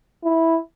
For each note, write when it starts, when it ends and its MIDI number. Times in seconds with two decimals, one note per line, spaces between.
0.24 0.57 64